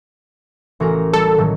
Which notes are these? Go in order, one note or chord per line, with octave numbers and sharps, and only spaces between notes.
A1 F#4 A#4
G3 A4 C#7
A2 D#3 F#3